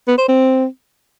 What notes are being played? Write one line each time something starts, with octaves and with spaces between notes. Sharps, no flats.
B3
C5
C4